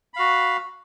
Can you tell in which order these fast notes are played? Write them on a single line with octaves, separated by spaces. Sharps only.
B5 F5 F#4